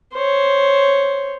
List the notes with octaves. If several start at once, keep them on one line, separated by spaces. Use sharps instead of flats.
C5 C#5